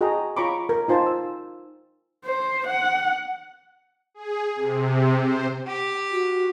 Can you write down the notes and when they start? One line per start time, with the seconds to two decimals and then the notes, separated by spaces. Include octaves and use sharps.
0.01 F#4 G#4 D#5 G5 A5 A#5
0.37 F4 C#5 A#5 B5 C#6 D6
0.69 A#4
0.88 D#4 F4 C5 G#5 A5
1.06 E6
2.25 C5
2.68 F#5
4.14 G#4
4.56 C3
5.18 C5
5.66 G4
6.12 F#4